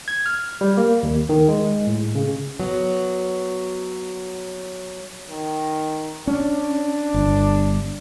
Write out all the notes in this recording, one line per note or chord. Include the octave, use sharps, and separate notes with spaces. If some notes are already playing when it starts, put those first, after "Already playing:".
G#6
F6
G3
A#3
D#2
D#3
G#3
A2
C#3
F#3 B3
D#3
C#4 D4
G1